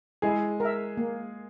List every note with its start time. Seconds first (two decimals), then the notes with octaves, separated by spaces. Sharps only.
0.22 G#3 E4 G#4
0.60 A#4 E5
0.97 A#3